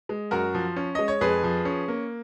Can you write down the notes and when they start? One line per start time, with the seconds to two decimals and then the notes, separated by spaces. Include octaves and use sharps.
0.09 G#3
0.31 F#2 F#4 A#4
0.54 F3
0.76 C#4
0.95 G#3 D#5
1.08 C#5
1.21 F2 G#4 B4
1.44 F3
1.65 C#4
1.88 A#3